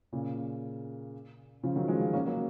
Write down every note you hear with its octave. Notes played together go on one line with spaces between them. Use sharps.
A#2 C#3
C#3 F3
D#3 F#3
F3 G#3
C#4 F4
A#3 C#4
F#3 A#3